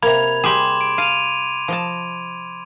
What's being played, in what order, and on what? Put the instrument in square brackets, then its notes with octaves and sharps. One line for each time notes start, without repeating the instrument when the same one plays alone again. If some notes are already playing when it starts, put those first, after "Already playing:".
[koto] C3 A#3 [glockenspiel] B5 G#6 F7
[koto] G3 G4 G#4 [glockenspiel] C6 D6 E7
[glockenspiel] D7
[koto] F5 A5 [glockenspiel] D#7 F7
[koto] F3 D#5 A5